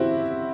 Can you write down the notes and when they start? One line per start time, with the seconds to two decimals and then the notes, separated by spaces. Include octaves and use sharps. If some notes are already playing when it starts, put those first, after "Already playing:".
Already playing: C4 E4 F#4 G4